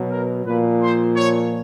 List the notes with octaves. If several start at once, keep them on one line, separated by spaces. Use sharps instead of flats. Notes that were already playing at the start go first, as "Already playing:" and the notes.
Already playing: B2 F#3
A#4
A#2 F3 B4
C5
C#5